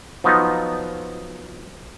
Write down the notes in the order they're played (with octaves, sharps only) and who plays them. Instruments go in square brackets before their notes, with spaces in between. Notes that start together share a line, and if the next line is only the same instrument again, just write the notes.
[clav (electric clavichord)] F3 F#3 B3 D#4